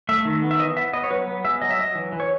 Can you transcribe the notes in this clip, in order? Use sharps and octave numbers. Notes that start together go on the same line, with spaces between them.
A3 E5
D#3
B3
E5
E3 D#5
B3 E5
B3 D#5
C#5
F#3 B4
B3
G#3 E5
F#3 D#5
E5
F#3 D#5
E3
E3
C#5